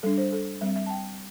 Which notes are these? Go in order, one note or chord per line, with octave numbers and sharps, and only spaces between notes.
G3 D4 A4
C5
A4
G3 C4 E5
E5
A5
G5